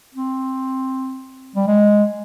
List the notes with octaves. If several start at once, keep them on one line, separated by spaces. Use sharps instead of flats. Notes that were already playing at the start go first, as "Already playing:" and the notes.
C4
G3
G#3